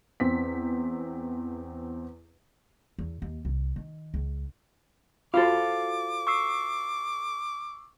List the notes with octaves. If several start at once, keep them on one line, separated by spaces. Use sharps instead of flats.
E2 C4 B6
E2
D#2
C2
D#3
C#2
F4 F#4 A4 C5 F5 D6
C#6 E6 C7